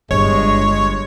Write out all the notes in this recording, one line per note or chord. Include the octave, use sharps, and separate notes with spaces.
G1 G2 G#3 C#5